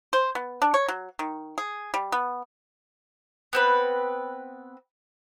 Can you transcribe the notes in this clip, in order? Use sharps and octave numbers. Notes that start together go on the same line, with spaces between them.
C5
B3
D4
C#5
F#3
D#3
G#4
G3
B3
B3 C4 B4